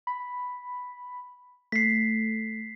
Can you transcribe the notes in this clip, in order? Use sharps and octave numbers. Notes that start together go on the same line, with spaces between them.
B5
A3 B6 C7